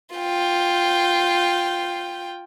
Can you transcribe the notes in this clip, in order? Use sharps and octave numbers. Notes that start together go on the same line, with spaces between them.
F4 G5